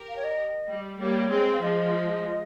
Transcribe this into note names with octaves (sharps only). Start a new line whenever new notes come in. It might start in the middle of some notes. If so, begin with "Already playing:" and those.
Already playing: G4 A#4
F5
C#5
D#5
G3
G3 A#3 C#5
G#3 C4
F5
F3 G#3 D#5